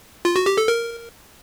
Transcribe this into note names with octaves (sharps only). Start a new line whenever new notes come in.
F4
F#4
G4
A4
A#4